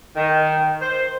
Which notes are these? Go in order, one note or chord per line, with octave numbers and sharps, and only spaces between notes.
D#3
C5